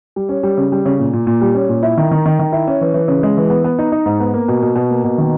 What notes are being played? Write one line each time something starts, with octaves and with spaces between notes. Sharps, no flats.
G3
C#4
G3
C#3
G3
C#3
A#2
A#2
A#2
G3
C#4
A#2
E4
D#3
D#3
D#3
D#3
E4
C#4
E3
E3
C#3
G#3
E3
B3
B3
D#4
D#4
G#2
B3
A#3
B2
B2
B2
A#3
B2
D#3